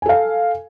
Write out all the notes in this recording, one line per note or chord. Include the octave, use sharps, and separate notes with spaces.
A4 F5 G#5